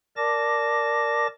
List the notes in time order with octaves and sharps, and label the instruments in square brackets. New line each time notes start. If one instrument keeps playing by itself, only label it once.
[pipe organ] A#4 D5 A5 D6 A#6